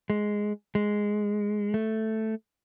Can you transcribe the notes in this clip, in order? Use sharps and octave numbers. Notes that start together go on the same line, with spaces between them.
G#3
G#3
A3